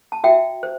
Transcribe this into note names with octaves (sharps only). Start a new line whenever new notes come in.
A5
F#4 E5 G5
C5